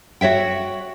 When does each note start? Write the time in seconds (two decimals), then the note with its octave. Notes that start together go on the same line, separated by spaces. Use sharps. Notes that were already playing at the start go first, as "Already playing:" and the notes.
0.21 F#4 C#5 E5 G5